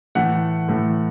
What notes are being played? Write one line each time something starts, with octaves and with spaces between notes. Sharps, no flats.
A2 E3 A3 F#5
A2 E3 A3